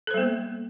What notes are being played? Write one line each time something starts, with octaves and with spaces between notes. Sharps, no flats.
G3 A#3 B3 A4 C5